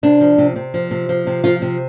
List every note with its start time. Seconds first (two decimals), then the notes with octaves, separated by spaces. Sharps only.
0.03 C3 D4
0.21 F3
0.38 C3
0.56 C3
0.74 F3
0.91 C3
1.09 F3
1.27 C3
1.44 F3 F4
1.62 C3